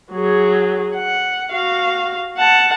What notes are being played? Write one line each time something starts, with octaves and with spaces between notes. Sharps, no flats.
F#3 G#4
F#5
F#4 F5
F#5 A5